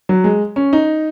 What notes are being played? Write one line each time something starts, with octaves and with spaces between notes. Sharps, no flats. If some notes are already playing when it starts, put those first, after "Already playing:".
F#3
G#3
C#4
D#4